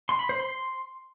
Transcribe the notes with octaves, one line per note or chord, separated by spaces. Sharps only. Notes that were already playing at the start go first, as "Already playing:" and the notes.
C6
B5
C5
C6